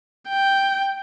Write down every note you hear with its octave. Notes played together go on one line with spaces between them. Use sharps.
G5